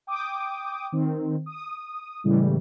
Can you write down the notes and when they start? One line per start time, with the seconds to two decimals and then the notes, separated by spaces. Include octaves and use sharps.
0.07 G5 D6 D#6
0.92 D#3 C4
1.46 D#6
2.24 A2 C#3 E3 G3 G#3